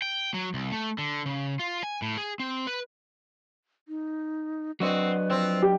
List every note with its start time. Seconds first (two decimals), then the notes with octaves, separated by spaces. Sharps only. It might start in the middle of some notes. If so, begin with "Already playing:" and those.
0.02 G5
0.34 F#3
0.54 C2
0.72 A3
0.98 D3
1.26 C#3
1.60 F4
1.83 G#5
2.02 A2
2.17 G#4
2.39 C4
2.67 B4
3.88 D#4
4.80 F#3 C4 D4 F#4 B4 D#5
5.30 F3 C4
5.62 G4